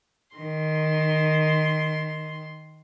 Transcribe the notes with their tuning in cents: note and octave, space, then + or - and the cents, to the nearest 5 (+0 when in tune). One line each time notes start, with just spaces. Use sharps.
D#3 +0 C6 +0